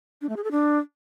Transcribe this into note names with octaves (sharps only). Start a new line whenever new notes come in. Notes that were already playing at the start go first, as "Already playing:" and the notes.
D4
A3
G#4
A4
D4